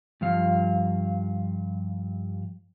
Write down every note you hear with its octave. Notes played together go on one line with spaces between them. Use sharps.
G2 F3 F5